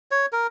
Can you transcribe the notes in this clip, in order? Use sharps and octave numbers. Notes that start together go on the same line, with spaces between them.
C#5
A#4